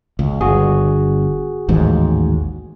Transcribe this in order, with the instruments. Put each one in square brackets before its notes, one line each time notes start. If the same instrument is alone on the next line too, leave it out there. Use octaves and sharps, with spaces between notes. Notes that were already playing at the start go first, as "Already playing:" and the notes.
[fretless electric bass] C#2
[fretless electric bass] G1 [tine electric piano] F#4 G#4
[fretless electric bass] A1 D#2 G#2